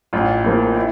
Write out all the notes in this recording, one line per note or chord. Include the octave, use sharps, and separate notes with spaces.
A1 F4
A2 F3 A#3
E4